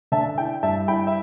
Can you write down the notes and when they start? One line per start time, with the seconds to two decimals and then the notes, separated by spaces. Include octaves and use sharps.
0.12 D3 E5 A5
0.38 E4 G5
0.63 G2 E5 A5
0.88 E4 G5 B5
1.07 E5